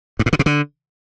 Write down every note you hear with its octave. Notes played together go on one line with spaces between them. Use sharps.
G2
A2
D3
B2
D3